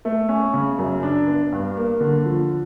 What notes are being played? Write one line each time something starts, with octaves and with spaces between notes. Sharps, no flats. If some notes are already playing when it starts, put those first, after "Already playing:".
A3
C#4
C#3
F#2
D4
B3
G2
A#3
D3
F3